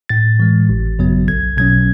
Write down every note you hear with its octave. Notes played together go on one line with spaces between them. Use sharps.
A2 A6
E3 G#3
G#1
F#2 C#3 F#3 B3
B1 G#6
B2 F#3 C#4 G#6